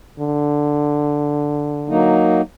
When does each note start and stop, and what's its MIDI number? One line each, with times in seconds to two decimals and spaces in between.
0.20 2.26 50
1.89 2.42 54
1.89 2.42 58
1.89 2.42 63